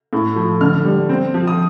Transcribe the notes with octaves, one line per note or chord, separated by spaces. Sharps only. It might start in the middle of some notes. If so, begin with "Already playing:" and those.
A2
F3
D3 F6
G3
C4
F3
D#6